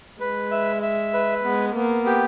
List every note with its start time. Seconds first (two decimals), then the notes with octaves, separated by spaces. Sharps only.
0.20 G#3 B4
0.51 E5
0.82 E5
1.14 B4
1.44 G#3 B3
1.75 A#3 B3
2.06 G4